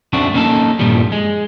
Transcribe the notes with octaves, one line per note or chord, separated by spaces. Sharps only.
F#2 A3 C4 D4 F#4
A#3 C#4 D#4 E4 A4
G2 A#2 D#3 F3 G3
G#3